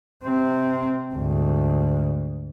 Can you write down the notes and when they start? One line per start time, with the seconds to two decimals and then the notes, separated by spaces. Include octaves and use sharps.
0.24 C3 C4
1.13 D2 G#2